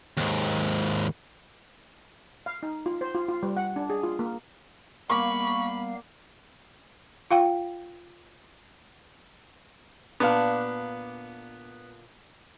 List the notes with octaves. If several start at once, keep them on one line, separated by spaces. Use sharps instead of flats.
D#2 G#2
F5
D#4
F4
C5
F4
F4
G3
F#5
D4
G#4
F4
A#3
G3 A#3 B3 F5 B5 C#6
F4 F5 G5
A#2 B3 D4 F5